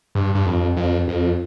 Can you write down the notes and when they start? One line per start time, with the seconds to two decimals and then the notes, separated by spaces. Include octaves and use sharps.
0.15 G2
0.35 G2
0.46 F2
0.76 F2
1.08 F2